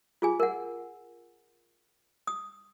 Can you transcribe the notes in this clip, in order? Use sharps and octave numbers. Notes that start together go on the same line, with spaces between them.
F4 G#4 G#5
A#4 F#5
D#6